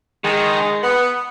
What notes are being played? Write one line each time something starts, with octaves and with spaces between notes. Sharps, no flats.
D#3 G#3
B3